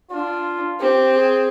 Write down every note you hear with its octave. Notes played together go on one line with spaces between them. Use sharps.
D4 F4
C4 G4
G#4